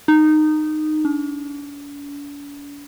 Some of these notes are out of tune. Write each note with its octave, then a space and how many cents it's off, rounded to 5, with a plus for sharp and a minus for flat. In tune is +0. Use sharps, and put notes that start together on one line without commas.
D#4 -15
D4 -45